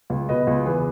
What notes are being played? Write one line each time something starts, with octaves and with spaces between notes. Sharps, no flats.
C#2
B2 B4 D#5
C#2
E2 G#4 B4